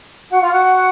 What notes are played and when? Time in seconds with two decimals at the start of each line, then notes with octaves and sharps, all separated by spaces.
0.30 F#4 F#5
0.41 F4 F5
0.51 F#4 F#5